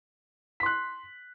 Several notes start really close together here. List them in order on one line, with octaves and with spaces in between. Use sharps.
B6 C6 F#6